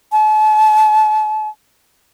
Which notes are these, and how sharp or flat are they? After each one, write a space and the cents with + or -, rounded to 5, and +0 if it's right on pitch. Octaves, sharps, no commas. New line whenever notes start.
A5 -40